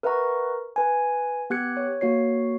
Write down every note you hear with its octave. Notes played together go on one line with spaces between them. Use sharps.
A#4 B4 E5 F#5 A#5 C#6
B4 G#5
B3 G4 F#6 G#6 C#7
C#5
A#3 F#4 C#5 C7